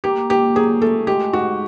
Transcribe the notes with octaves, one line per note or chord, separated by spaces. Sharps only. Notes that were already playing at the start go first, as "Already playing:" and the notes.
A#3 G4
A#2 G4
F#3 G#4
A3 A4
G#3 G4
G#2 F#4